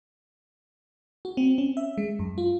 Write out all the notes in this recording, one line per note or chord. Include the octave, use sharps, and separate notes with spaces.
F#4
C4
C#4
E5
G#3
F#2
F4